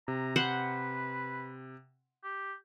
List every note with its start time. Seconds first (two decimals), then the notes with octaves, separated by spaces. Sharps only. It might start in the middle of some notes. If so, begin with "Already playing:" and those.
0.08 C3 A#5
0.36 B4 C5 F#5
2.24 G4